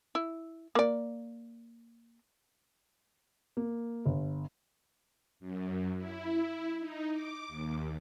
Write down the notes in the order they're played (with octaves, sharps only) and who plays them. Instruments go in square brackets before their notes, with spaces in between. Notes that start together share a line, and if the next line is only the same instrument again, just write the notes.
[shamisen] E4
A#3 D5
[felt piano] A#3
G1
[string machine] F#2
E4
D#4
D6
D#2